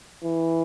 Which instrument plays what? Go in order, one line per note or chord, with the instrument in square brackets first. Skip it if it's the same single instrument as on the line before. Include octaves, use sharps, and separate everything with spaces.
[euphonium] E3